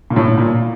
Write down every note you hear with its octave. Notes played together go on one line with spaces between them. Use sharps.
A#2
A2
A#2